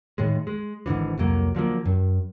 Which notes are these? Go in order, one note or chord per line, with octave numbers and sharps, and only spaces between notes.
A2 D#3 G#3
G#3
G#1 G#2 D3 E3
C2 F2 F#3 A#3
D3 F3 F#3 A#3
F#2